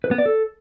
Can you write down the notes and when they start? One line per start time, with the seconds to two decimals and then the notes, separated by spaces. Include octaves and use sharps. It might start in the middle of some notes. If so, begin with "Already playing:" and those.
0.04 B4
0.11 B3
0.18 D5
0.26 A4